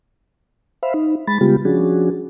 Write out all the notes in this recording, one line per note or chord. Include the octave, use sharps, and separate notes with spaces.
C5 E5 F5 B5
D#4
G#3 B5 A6
C#3 G3 G#3 B3 F4 G4
F3 C#4 D4 F#4 G#4